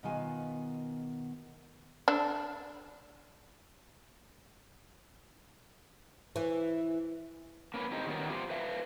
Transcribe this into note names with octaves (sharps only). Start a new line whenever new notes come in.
B2 D#3 B3 D#4 F4 G#5
D4 A4
E3
A#3 C#4 B4
A2 C4 D#4 G4
D#3 G3 B3 C#4 F#4 A#4
F4 G4 B4 C5
B4 E5 F5